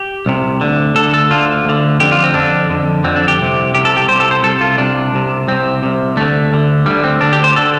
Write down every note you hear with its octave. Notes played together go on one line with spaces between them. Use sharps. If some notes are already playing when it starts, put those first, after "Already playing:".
Already playing: G4
C2 C3
D2 D3
D2 D3 A4
A4
D2 D3 F4
D2 D3
F2 D3 G4
F4
C4
F2 D3 D4
F2 D3
F2 D3 C4
D4
G4
C2 C3
C2 C3 G4
A4
G4
C2 C3 C5
A4
C5
C2 C3 A4
F4
C2 C3 D4
C2 C3
C2 C3 C4
C2 C3
D2 D3 A3
D2 D3
D2 D3 G3
C4
D2 D3 D4
G4
C5
D3 A4